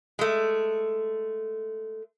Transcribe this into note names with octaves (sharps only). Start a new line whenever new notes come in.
G#3 A3